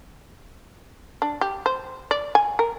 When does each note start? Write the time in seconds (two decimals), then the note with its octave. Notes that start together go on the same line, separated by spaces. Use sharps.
1.22 D4
1.41 G4
1.66 C5
2.11 D5
2.35 G#5
2.59 A#4